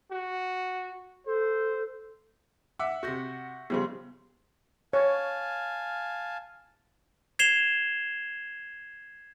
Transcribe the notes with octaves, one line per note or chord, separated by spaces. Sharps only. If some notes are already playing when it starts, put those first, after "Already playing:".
F#4
A4 C5
E5 F#5 D6
C3 F#4 C#6 G6 A#6
C#3 F3 G3 B3 C5 C6
C#5 F5 G#5 A5
G#6 C7 E7 F7 G7